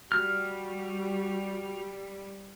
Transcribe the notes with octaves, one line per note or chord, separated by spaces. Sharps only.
G3 F#4 F6